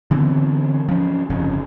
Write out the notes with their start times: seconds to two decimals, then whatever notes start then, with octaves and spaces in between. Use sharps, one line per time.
0.11 D3 E3 B3 C4
0.89 F3 C#4
1.30 G1 F2 C#3